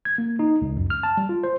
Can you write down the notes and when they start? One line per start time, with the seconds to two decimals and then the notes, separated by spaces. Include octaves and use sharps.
0.05 G#6
0.18 A#3
0.39 D#4
0.62 C#2
0.77 F#2
0.90 F6
1.03 A5
1.17 G3
1.29 F4
1.43 C5